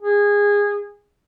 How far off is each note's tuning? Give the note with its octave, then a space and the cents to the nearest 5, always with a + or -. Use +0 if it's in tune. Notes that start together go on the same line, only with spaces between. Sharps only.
G#4 -20